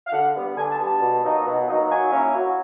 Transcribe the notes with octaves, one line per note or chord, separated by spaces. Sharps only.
F5
D3 F#5
G3 B3
D3 G#5
A5
G3 B3
A5
B2
F#3 A#3 D#4
B2
F#3 A#3 D#4
F#3 G#5
A#3 C#4 E4
F#3